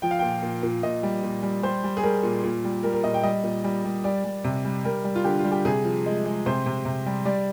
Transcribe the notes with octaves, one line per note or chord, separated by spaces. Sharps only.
F3 G5
F5
A#2 G5
A#2
A#2
A#2 D#5
G3
A#2
G3
G3 C5
G3
G#4
G3 A#4
A#2
A#2
G3
G3 A#4
A#4
A#2 D#5
G5
G3 D#5
A#2
G3
G3
G3 D5
G3
C3
G3
G3 A#4
G3
F4
D3 G4
F4
G3
G4
C3 G#4
F3
G#3
G#3
C3 C5
C3
C3
G3
G3 D5